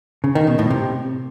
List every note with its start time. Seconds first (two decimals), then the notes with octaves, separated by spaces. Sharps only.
0.24 C#3
0.35 D#3
0.47 B2
0.59 A2
0.70 C3